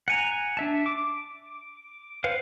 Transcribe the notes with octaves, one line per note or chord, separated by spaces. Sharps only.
F#5 G#5 A#5
D4 E5 A5
D6
B4 C5 F5 F#5